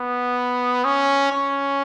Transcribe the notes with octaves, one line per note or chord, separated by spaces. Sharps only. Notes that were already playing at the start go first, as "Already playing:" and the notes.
Already playing: B3
C#4
C#4